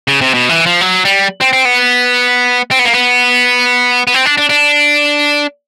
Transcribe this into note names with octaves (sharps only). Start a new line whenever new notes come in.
C#3
C3
B2
E3
F3
F#3
G3
C4
C4
B3
C4
B3
A#3
B3
B3
C4
D4
D4
D4